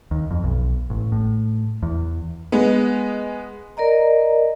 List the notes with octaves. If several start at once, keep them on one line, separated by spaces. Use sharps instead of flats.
D#2
F2
B1
A1
A2
E2
G#3 B3
A#4 D5 D#5 A#5